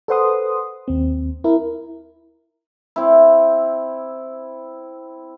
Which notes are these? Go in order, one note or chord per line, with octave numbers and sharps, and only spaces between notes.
A4 B4 C5 F#5 C6 D#6
D#2 C4
E4 A#4
C4 E4